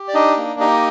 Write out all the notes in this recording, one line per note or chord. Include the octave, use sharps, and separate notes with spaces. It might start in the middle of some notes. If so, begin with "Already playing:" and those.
Already playing: G4
D5
D4 D#4 D#5
A#3
D#4 G4 D#5